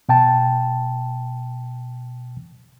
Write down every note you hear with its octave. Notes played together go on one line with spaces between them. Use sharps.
B2 G5 A5